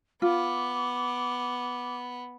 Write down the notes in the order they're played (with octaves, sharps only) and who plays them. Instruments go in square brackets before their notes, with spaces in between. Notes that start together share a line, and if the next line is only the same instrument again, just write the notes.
[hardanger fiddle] B3 [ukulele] F4 [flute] D6